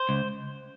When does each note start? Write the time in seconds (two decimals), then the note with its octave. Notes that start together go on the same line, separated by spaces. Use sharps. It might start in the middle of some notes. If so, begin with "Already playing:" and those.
Already playing: C5
0.09 C#2